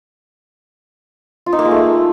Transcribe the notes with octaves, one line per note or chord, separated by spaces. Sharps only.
F4
D#4
A#3
G#3
A3